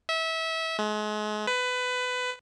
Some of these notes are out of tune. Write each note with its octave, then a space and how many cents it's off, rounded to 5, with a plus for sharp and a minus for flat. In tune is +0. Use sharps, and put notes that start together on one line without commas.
E5 -25
G#3 +35
B4 +20